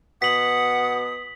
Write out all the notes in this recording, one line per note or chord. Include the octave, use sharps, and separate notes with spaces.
B2 F#5 D#6 B6 F#7